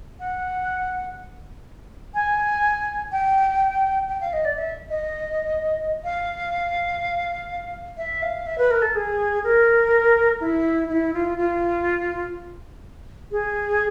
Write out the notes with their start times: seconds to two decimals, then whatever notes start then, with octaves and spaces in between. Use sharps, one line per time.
0.20 F#5
2.14 G#5
3.12 G5
4.09 G5
4.21 F5
4.33 D#5
4.45 D5
4.58 E5
4.90 D#5
6.04 F5
7.97 E5
8.22 F5
8.47 E5
8.58 B4
8.71 A#4
8.82 A4
8.95 G#4
9.44 A#4
10.41 E4
10.89 E4
11.14 F4
11.38 F4
13.31 G#4